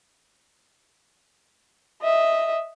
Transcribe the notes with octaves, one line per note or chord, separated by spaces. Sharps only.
D#5 E5